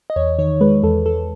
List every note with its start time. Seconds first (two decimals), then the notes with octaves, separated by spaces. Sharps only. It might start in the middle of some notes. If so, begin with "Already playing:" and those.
0.10 D#5
0.16 E2 C#5
0.38 D#3 C#5
0.61 G#3 B4
0.83 E2 A4
1.06 E2 A4